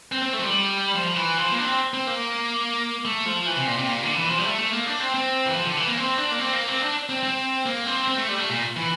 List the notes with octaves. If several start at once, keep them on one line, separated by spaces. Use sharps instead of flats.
C4
C4
A3
F3
G3
F3
F3
E3
F3
A#3
D4
C4
C4
A#3
A3
F3
E3
C3
A#2
C3
A#2
D3
E3
F3
G3
A3
A3
A#3
D4
C4
C4
E3
F3
D3
E3
A#3
C4
D4
A#3
C4
A#3
C4
D4
C4
C4
A#3
C4
C4
A3
G3
A3
A#2
E3